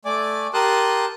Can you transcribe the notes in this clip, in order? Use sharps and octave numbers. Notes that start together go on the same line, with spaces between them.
A3 D5 G#5 D6
G4 A#4 A5 C6 D#6 F#6